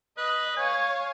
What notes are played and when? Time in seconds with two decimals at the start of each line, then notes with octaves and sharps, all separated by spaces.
0.18 B4 D#5
0.57 C#5 F5 G#5